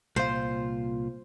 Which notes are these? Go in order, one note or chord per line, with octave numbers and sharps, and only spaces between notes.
C2 A#2 F4 C5